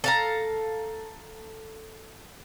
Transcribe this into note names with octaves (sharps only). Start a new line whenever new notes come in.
A4 F5 A#5